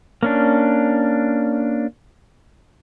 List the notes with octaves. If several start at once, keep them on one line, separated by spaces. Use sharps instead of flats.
A#3 C#4 D4